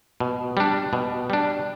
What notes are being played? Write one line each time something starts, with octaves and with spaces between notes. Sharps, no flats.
B2
G3 D4
B2
G3 D4